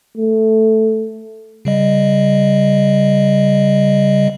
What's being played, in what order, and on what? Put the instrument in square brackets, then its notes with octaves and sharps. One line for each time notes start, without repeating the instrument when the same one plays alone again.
[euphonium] A3
[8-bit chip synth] C#3 G3 D#5